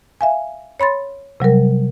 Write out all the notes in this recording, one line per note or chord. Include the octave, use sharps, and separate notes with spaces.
E5 F5 G#5
C#5 B5 C6 A6
C3 F#3 G3 A#4